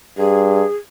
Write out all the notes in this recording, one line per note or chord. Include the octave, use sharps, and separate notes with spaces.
G2 G#4